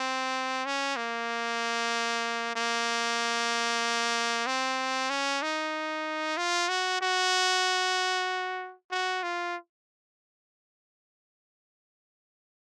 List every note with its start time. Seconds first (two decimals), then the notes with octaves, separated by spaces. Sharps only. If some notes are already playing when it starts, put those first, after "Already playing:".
Already playing: C4
0.66 C#4
0.96 A#3
2.55 A#3
4.47 C4
5.10 C#4
5.42 D#4
6.37 F4
6.69 F#4
7.01 F#4
8.91 F#4
9.23 F4